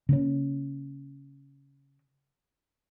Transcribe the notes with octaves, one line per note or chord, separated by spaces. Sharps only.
C#3 A#3 C#4